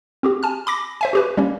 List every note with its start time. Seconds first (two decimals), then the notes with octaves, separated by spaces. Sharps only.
0.23 C4 F#4 G4
0.43 G#5 A5 F6
0.67 B5 D6 A#6
1.01 C5 E5 G#5
1.13 F#4 G4 B4
1.37 G3 A#3 C#4